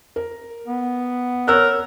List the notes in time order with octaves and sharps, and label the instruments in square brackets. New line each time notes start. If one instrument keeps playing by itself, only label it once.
[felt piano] A#4
[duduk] B3
[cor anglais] A#4 [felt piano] C#5 E6 F#6